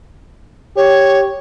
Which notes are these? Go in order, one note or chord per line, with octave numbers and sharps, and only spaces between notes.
G4 C#5